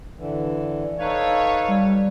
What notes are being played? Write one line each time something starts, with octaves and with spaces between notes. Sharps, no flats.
D3 E3
D#4 A4 B4 C#5 F5
G3